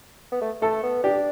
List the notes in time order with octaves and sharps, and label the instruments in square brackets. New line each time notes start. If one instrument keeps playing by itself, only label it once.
[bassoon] B3
A3
[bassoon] A3 [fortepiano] A4
[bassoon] B3
[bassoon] D4 [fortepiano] G4